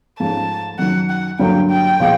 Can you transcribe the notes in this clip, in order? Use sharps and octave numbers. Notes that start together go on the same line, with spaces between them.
G#2 F3 A3 C#4 A5
F#2 D#3 F#3 F#5
F#5
G2 D3 F#3 A#3 D4 G5
G5
A#2 F3 G#3